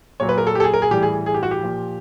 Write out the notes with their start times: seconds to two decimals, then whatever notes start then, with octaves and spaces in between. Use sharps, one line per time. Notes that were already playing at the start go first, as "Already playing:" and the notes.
0.20 A#2 F#3 C#5
0.29 B4
0.38 A#4
0.47 A4
0.55 G4
0.60 A4
0.64 G#4
0.74 A#4
0.82 G#4
0.91 A2 E3 G3 G4
1.03 G#4
1.26 G#4
1.34 G4
1.43 F#4
1.51 G4
1.63 A#2 F3